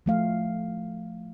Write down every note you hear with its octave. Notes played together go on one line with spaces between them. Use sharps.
F3 A3 F5